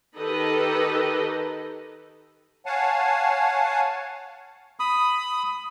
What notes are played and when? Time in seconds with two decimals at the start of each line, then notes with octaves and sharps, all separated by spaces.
0.17 D#3 G4 A4 B4 D#5
2.66 C#5 F5 F#5 G#5 A5
4.80 B5 D#6